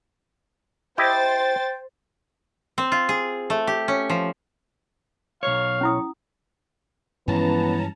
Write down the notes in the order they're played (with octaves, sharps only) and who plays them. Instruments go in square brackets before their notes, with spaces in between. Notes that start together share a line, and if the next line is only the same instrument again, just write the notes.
[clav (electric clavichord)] E4 G4 D#5 [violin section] C5 A6 [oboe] G5
[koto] C4
F4
G#4
A3
G4
C#4
F3
[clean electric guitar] B1 C#5 [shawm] F5
[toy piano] C#4 E4 D#6
[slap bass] G2 F3 G#3 [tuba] E3 [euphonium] B3 [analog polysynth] C#4 A5 A#5